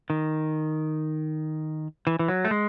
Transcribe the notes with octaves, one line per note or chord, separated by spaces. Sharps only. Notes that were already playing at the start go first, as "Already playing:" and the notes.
D#3
E3
E3
F#3
A3
G#3